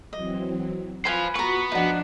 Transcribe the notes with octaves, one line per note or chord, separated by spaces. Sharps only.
E3 F#3 C4 D#5
F4 B4 C5 F5 G#5 B5
B3 F#4 B4 A#5 C#6
F3 D4 D#4 F#5